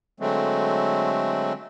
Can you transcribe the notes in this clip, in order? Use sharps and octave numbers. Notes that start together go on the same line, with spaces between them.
D3 F#3 G#3 A3 C4